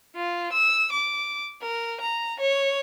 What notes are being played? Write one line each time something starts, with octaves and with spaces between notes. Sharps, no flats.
F4
E6
D6
A#4
A#5
C#5